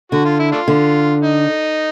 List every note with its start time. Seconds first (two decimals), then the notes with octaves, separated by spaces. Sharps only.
0.12 D3 F#4
0.25 F4
0.39 E4
0.52 A3 D4 F4
0.68 D3
1.23 D#4